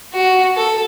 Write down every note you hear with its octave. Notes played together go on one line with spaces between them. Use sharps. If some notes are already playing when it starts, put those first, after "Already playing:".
F#4
A4